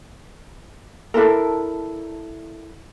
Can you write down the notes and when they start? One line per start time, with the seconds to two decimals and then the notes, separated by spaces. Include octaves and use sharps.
1.14 D4 E4 A4 A#4